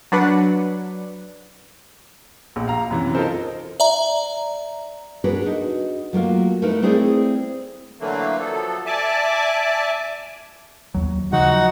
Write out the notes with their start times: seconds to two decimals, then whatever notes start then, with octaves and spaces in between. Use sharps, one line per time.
0.12 F#3 D4 B4 F#5
2.56 A#1
2.68 F5 A#5
2.91 F#2 C3 E3
3.15 D#4 F4 A4 A#4 C5
3.80 D5 E5 A#5
5.24 D4 F#4 G#4 A#4 B4 C#5
5.43 D#4 F#4
6.13 F#3 A3 A#3 F4
6.62 A3 D#4 E4 A#4 B4
6.82 A3 C4 E4 G#4 C5 D5
8.00 D3 E3 F#3 A3 A#3
8.39 F3 F#3 A4
8.86 D5 E5 G#5 A5 D6
10.94 D#2 F#3
11.32 C#3 F3 F#3 D#4 F#4 F#5